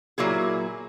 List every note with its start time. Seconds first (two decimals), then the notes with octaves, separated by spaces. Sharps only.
0.18 A#2 F#3 A#3 E4 G#4